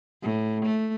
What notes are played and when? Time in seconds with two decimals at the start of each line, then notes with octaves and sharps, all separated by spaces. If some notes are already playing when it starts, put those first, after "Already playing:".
0.22 A2
0.65 A3